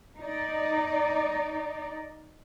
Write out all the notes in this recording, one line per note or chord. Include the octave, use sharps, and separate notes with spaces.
D#4 D5